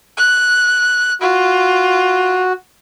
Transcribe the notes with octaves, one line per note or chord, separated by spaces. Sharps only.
F#6
F4 F#4